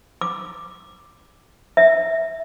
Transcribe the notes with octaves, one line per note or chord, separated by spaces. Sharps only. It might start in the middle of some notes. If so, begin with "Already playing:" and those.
D6
E5